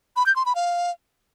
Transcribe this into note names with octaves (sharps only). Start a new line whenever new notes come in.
B5
G6
C6
B5
F5